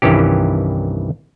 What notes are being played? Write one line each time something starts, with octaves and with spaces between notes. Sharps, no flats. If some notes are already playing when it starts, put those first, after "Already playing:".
C2 G2 D#3 E3 C#4 G4